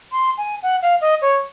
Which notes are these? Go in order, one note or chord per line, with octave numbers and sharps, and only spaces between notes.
C6
G#5
F#5
F5
D#5
C#5